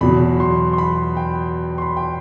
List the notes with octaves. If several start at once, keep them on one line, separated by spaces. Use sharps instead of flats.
E2 B2 F#3 B5
C6
C6
B5
G5
C6
B5
G5